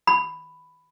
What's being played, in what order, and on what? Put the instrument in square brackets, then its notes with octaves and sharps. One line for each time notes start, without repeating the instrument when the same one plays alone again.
[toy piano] B5